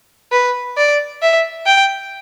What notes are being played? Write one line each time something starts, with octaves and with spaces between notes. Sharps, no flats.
B4
D5
E5
G5